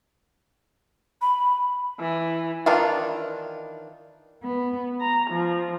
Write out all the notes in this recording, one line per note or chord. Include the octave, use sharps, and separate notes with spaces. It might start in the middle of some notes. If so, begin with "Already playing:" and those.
B5
E3
D#3 E3 D4 D#4 F4
B3
A#5
F3